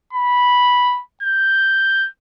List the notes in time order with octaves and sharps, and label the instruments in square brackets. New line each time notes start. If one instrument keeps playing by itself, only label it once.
[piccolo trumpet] B5
G6